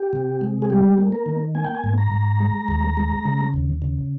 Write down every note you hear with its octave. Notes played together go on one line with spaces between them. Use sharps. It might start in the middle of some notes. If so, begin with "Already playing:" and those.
Already playing: G4
C3
G#3
G#4
G3 G4
A#3
A#4
D#3
A#3 G#5
G5
G#5
G#2
A#5
G#2
G#3
D#2
G#3
C#3
D#2
C#3